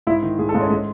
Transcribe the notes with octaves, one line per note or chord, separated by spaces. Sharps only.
G#2 E4
D#3
G#2 G#4
A4
G#2
C#4
G#3